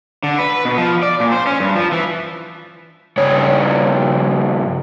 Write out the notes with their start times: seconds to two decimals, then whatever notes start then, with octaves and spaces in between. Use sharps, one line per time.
0.23 D3
0.39 B4
0.65 B2
0.77 F3
1.03 D5
1.20 A#2
1.32 C5
1.47 C#4
1.60 G2
1.75 F3
1.92 E3
3.17 G2 C#3 C#5